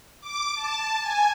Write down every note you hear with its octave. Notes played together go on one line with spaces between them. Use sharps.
D6
A5
G#5